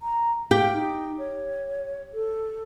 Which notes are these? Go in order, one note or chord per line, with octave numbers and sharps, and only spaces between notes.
A#5
G4 F5 G5
D#4
C#5
A4